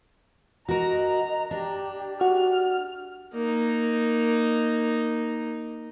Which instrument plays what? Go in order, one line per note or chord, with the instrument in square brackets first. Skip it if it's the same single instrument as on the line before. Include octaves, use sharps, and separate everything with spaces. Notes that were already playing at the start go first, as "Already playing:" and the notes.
[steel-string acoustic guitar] F#4 A#4 [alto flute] D#5 [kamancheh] A#5
[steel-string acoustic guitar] D4 [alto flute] G4
[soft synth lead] F#4 [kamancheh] F6
[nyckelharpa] A#3 D#4